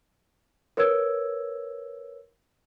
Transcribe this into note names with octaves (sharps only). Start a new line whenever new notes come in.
A#4 B4 C#5 E6 G#6